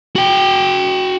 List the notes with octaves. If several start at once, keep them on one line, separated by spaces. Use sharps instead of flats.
F#4 G5